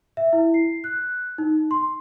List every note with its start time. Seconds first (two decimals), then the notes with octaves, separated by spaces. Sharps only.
0.17 E5
0.33 E4
0.54 C7
0.84 F#6
1.38 D#4
1.71 C6